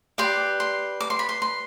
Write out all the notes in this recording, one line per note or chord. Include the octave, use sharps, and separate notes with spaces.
G4 B4 D5 C6
C6
D6
C6
B5
C6
C6